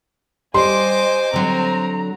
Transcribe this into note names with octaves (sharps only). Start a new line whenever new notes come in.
G3 C5 D#5 G#5 C6 D6
D3 F#3 C4 A#5